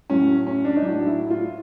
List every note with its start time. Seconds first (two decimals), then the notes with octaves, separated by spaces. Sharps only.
0.10 A2 F#3 C#4
0.47 C#4
0.65 D4
0.77 D#4
0.82 A2 F#3 D4
1.06 E4
1.30 F4